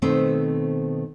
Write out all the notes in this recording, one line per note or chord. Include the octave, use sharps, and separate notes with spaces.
B2 D#3 A3 C4 B4 C5